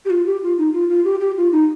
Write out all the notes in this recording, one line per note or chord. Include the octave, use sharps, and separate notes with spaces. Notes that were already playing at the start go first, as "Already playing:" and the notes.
G4
F4
G4
F4
D#4
F4
F4
G4
G4
F4
D#4